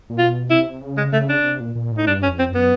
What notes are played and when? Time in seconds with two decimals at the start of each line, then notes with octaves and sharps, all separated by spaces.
0.10 A#2
0.18 B2 F4
0.50 C3 E4
0.81 C#3
0.97 G#3
1.13 C#3 A3
1.29 D4
1.40 C#3
1.44 C3
1.60 A#2
1.75 A#2
1.92 A2
1.98 D#4
2.07 G2 D4
2.23 C#4
2.28 F2
2.39 C4
2.50 F#2 B3